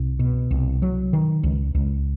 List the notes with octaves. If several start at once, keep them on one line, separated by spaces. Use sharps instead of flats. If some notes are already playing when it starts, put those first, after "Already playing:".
Already playing: C2
B2
C2
F#3
D#3
C#2
C#2